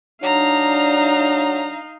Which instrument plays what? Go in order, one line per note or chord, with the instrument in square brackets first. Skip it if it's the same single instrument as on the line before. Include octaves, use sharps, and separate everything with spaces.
[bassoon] F#3 [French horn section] D4 [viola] D#4 F5 [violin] A#5